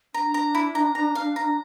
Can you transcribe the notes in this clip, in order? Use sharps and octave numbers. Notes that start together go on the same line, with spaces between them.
D4 A#5
A#5
E4
A#5
A#5
F5
A#5